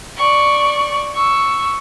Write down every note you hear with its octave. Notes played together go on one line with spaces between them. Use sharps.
D5 C#6
C#6 E6